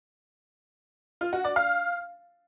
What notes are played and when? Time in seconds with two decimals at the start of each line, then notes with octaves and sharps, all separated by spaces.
1.21 F4
1.33 F#4
1.44 D5
1.56 F5